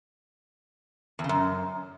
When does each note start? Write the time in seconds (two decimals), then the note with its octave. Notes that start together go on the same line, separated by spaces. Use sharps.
1.19 E2
1.24 C#3
1.29 F#2